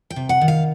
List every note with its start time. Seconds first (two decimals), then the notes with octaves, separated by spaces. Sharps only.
0.10 G5
0.16 C3
0.29 F#5
0.41 D#3
0.48 F5